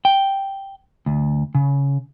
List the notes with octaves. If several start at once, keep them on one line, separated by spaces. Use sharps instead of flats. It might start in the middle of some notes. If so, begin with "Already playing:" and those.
G5
D2
C#3